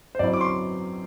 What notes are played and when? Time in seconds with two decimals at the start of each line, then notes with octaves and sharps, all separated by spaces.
0.15 C5
0.19 F#2 F#3 C4 E4 D5
0.33 D6
0.41 C6